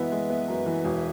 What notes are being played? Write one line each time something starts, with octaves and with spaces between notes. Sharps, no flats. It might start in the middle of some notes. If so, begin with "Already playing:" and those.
Already playing: F#2 E3 G#3 B3 B4 E5
G#3
B3
F#2
E3
E1